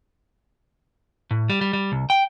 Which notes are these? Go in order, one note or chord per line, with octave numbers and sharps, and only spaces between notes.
A2
G3
G3
G3
C2
G5